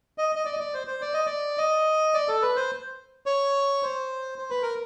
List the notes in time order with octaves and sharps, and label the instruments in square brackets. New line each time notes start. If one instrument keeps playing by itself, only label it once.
[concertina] D#5
D#5
D5
D#5
D5
C5
C5
D5
D#5
D5
D#5
D5
A4
B4
C5
C#5
C5
C5
B4
A#4